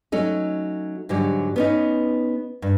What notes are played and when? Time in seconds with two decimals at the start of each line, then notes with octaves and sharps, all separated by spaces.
0.12 F#3 A3 C#4 D#4
1.09 G#2 D3 F#3 G3
1.56 B3 C#4 D#4
2.62 G2